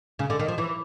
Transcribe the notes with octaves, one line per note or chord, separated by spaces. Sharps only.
C#3
D3
D#3
F3
E3